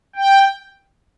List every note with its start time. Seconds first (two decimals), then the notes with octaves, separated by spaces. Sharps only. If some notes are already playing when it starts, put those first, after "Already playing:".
0.16 G5